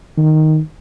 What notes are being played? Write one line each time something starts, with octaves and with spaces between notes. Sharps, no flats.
D#3